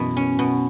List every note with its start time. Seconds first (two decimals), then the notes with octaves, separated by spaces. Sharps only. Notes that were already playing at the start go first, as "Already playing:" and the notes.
Already playing: F#2 B2 E3 B3
0.17 C#4
0.39 B2